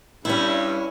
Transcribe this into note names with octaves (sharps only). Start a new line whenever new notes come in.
G2 C#4 E4